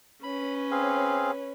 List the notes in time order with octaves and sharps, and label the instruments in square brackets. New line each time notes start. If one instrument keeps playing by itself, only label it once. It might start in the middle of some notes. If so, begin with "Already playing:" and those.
[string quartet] C#4 B4 C#5 [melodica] B5
[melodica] C4 G#4 F5